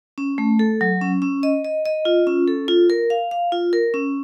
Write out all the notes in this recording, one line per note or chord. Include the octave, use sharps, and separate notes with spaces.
C#4
A3
A4
F#3
C#4
C#4
D#5
D#5
D#5
F4
C#4
A4
F4
A#4
F5
F5
F4
A#4
C#4